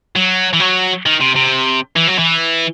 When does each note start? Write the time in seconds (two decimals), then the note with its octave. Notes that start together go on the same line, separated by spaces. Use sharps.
0.16 F#3
0.53 E3
0.60 F#3
1.06 D#3
1.20 C3
1.35 C3
1.96 E3
2.07 F#3
2.18 E3